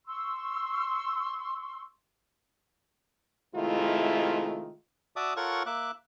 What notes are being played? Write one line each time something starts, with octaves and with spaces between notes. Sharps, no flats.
C6 C#6 E6
C3 D#3 G#3 A3 E4 F4
F#4 D5 E5 A5 D6 D#6
F4 A4 A#4 C#5 F#5 C#6
A#3 E5 D6 F#6